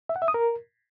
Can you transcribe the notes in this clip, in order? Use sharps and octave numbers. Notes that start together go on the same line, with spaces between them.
E5
F#5
E5
D#6
A#4